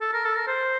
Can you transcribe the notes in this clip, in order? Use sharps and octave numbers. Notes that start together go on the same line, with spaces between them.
A4
A#4
A4
A#4
C5